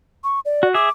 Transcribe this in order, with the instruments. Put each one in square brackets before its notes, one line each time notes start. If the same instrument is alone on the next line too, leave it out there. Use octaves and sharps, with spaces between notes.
[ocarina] C#6
D5
[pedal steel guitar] F#4
[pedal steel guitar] G#4 E5 [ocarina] D6